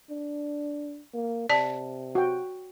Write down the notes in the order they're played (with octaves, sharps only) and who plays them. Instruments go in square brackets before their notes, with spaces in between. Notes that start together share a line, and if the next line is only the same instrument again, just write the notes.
[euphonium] D4
A#3
[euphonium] C3 [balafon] D5 A5
[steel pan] F#4 G5